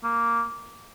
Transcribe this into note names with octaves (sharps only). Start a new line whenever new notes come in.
A#3